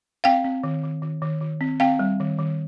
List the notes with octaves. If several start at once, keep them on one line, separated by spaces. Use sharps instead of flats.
C4 F5 G5
C4
D#3
D#3
D#3
D#3
D#3
C4
C4 F5 G5
G3
D#3
D#3